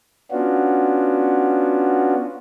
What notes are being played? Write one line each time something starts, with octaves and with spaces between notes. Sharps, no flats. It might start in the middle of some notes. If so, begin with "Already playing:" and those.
B3 C#4 D4 F4 F#4